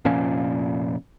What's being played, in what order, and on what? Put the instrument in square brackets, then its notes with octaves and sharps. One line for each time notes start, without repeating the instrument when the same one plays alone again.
[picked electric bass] F1 A#2 F3 C#4